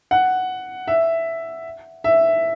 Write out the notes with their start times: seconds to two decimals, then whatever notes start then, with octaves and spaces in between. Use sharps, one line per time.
0.11 F#5
0.88 E5
2.04 E5